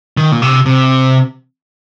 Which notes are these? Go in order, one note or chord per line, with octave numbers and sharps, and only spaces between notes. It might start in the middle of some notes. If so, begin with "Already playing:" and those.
D#3
A#2
C3
C3